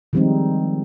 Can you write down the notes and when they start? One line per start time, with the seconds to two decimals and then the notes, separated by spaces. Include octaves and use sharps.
0.13 D#3 F3 G3 G#3 C4 D#4